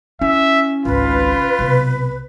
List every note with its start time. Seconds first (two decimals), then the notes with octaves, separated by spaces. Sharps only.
0.21 C#4 E4 E5
0.85 G#1 C#2 F4 B4
1.59 B1 C3